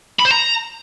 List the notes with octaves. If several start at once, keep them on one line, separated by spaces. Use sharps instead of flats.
B5
C5
A#5